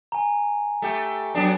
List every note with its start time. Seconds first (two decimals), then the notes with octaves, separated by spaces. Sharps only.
0.12 G#5 A#5
0.82 A3 G4
1.35 F#3 B3 D4